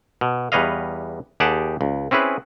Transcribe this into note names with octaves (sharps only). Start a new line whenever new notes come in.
B2
E2 G3 B4 C#5 D#5 F5
D#2 G4 G#4 F#5 G5 A5
C#2
C4 C#4 E4 G#4 B4